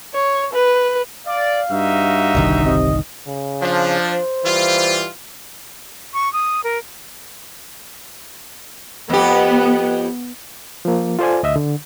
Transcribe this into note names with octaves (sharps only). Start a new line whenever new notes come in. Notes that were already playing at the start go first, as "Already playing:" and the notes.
C#5
B4
D5 F5
G2 D#4 F#4 E5
G1 C2 D#3
C3 D#5
C#3
F3 D4
C5
E3 G3 F4
C#6
D#6
A#4
F2 B3 G4
F3 A#3
F4 A4 C5 D5 G#5
D2 D#5 E5
D3